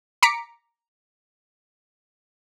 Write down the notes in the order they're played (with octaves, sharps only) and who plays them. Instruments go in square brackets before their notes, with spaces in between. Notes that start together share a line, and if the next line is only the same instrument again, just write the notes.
[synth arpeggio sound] A#5 D6 B6 C#7 D7